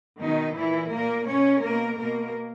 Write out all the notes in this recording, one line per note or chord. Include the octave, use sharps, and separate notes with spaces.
B2 D#3 D#4
A#2 E3 E4
A#2 A#3 A#4
B2 C#4 C#5
B2 A#3 A#4
B2 A#3 A#4